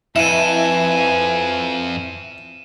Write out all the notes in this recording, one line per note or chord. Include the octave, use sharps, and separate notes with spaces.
F2 E4 B4 G#5 D#7 E7